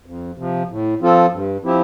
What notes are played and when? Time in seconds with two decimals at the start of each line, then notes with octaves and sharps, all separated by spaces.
0.06 F2
0.38 C3 F3
0.69 A2
1.01 F3 C4 F4 A4
1.32 G2
1.64 F3 C4 E4 G4